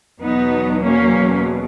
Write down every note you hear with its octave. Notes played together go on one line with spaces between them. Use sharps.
E2 B2 F#3 B3 D#4
A#3 C#4